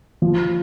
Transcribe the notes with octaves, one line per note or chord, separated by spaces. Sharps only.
F3